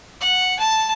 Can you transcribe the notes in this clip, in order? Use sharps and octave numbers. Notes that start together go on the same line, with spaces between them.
F#5
A5